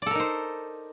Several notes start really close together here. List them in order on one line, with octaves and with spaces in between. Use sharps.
D5 A4 A#4 D#4 C5